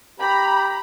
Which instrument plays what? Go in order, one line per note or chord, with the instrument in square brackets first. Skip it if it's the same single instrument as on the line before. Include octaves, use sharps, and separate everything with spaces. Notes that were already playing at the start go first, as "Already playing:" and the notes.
[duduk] G4 [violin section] A#5 B5